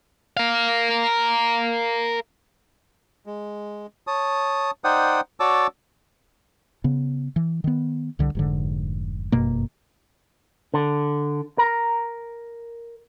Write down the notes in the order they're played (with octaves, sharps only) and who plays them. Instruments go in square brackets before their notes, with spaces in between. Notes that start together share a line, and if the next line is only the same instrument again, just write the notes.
[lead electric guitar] A#4 F5
[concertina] G#3
C#5 A5 D#6
D#4 C5 D5 F#5 G5 D#6
F#4 C#5 D5 A5 D6 E6
[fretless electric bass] C#3 B3
E3
D#3 B3
C2 D3 G3
F1 G#2 D3
G1 F#2 B2 A#3
[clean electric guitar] D3
A#4